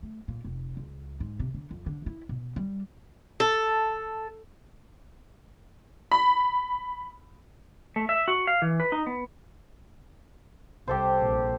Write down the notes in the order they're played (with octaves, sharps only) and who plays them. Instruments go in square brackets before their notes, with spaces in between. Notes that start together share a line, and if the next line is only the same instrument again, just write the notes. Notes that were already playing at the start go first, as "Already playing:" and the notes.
[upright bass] A3
A#2
F1
C#2
G#2
C3
D3
F2
D3
E4
B2
G3
[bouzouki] A4
[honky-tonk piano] B5
[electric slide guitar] A3
E5
F#4
F5
E3
B4
D#4
B3
[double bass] C2 [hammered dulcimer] G4 A4 C5
[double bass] A#1